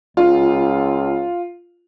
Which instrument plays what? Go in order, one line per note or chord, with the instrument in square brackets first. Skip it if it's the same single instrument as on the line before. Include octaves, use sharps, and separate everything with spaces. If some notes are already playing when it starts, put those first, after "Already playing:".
[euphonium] C#2 [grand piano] F4